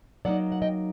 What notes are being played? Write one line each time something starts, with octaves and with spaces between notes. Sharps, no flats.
F#3 A#3 D#4 D5 F#5
F#5
D#5 G5